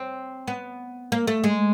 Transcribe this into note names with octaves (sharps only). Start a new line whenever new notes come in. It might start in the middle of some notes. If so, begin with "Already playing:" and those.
Already playing: C4
B3
A#3
A3
G#3